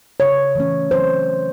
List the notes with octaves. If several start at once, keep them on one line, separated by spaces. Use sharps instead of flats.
C#3 C#5
E3 A3 C#4
F#3 C5